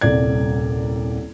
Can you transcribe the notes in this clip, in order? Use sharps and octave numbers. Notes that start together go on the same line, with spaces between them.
D#1 C2 D5 G#6